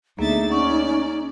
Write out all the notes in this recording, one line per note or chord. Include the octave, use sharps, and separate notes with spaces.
D2 A#3 B3 D#4 G#4 E5 A6
C#4 D5 F#5 C#6